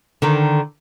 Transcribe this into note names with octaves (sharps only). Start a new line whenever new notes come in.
D3 D#3